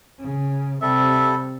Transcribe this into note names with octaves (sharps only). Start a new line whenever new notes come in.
C#3
C3 G3 A4 E5